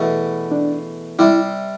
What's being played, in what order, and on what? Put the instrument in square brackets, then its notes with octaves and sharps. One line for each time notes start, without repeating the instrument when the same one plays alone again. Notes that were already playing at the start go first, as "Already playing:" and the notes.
Already playing: [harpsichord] E2 B2 A3
[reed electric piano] D4
[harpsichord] C3 G3 C4 [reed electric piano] E4